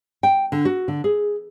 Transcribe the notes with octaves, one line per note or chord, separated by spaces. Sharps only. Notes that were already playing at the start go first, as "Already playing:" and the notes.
G5
D3
F#4
D3
G#4